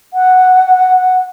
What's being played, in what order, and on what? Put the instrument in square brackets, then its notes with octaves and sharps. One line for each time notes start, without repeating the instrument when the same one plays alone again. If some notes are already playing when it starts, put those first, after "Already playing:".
[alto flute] F#5